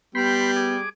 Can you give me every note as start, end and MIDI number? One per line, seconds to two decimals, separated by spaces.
0.15 0.85 55
0.15 0.77 59
0.15 0.51 79
0.15 0.51 83
0.15 0.51 84
0.56 0.89 68
0.56 0.89 86